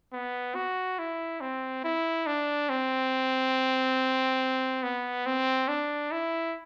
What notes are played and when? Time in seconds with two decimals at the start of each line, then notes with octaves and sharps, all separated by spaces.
0.13 B3
0.55 F#4
0.99 E4
1.41 C4
1.84 E4
2.26 D4
2.69 C4
4.83 B3
5.26 C4
5.68 D4
6.12 E4